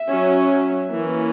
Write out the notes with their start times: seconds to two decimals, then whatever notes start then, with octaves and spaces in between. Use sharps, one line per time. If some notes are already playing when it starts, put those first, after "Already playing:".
Already playing: E5
0.09 F#3 C#4
0.91 E3 A#3 C#4